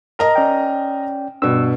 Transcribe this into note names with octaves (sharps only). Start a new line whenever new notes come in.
A#4 D#5 A5 A#5
C#4 D5 G5
G2 B2 E6